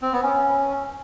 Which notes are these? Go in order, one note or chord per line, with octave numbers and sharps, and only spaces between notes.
C4
B3
C#4